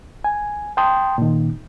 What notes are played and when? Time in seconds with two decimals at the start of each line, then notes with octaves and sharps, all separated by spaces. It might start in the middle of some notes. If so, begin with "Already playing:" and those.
0.24 G#5
0.77 G5 A5 C6 D#6
1.18 A#2 D#3